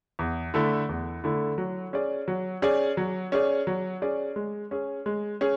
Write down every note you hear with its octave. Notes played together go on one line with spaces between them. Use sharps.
E2
D3 A3 E4 A4
E2
D3 A3 E4 A4
F#3
C#4 G#4 D5
F#3
C#4 G#4 D5
F#3
C#4 G#4 D5
F#3
C#4 G#4 D5
G#3
C#4 G#4
G#3
C#4 G#4